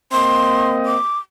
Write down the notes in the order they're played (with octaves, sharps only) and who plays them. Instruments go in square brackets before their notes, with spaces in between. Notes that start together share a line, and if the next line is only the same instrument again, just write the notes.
[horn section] A#3 C4 D#5 [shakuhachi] C6
[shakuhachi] D6